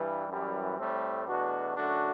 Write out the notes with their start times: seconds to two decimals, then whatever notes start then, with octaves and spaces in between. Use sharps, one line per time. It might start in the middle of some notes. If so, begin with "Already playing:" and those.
Already playing: G2 E3 G3
0.29 F#2 E3 G3
0.78 A2 G3 A3 C4
1.27 E2 B2 A3 D4 F#4
1.76 F#2 D3 A3 D4 F#4